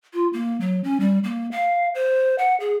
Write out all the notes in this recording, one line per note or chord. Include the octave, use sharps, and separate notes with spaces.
F4
A#3
F#3
C#4
G3
A#3
F5
C5
F#5
G#4